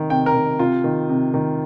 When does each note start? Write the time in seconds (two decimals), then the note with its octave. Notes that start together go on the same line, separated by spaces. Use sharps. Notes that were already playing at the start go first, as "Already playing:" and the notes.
Already playing: C3 D#3
0.10 C3 G5
0.26 A#4
0.34 D#3
0.59 C3 F4
0.84 D#3
1.09 C3
1.34 D#3